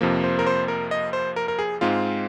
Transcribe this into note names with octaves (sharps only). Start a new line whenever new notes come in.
F2 C3 F3 A#3
C5
A#4
C5
A#4
D#5
C5
A#4
A#4
G#4
G#2 G#3 C4 F4